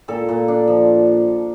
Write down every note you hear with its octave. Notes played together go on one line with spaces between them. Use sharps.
A#2 A4
A#2
D4
F3